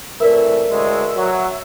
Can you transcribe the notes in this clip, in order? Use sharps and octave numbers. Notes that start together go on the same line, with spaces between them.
C3 E3 A3 A#4 B4 D5 E5
D2 A2 G#3
F#3